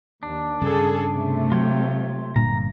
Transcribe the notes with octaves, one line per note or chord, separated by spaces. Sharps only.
D#2 D4
G2 C#3 G#4 A4
C3 A3
F#3 F4 C#5 G5
G1 G2 A#2 A#5